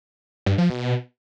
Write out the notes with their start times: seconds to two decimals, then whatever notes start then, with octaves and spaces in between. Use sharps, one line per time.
0.46 G2
0.58 F3
0.70 B2